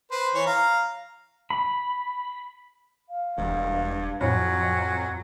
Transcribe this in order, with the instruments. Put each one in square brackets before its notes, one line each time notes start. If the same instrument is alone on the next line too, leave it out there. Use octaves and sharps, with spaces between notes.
[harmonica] B4 C5
E3 C#5
F5 A#5
[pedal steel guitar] B5
[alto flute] F5
[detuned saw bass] E1 [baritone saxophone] G2
[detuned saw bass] F2 [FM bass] A2 [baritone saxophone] F#3 [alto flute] G#5